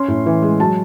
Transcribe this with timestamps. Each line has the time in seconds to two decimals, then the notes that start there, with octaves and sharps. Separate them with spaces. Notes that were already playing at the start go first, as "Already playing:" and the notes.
Already playing: C#4 C6
0.08 A2
0.26 E3
0.42 G#3
0.60 F#3 A5